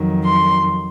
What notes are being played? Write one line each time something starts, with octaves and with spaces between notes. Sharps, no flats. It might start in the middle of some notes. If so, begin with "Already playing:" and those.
Already playing: F2 D#3 F#3
C6